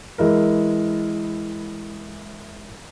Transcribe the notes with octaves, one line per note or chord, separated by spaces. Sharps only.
E3 G#3 E4 A#4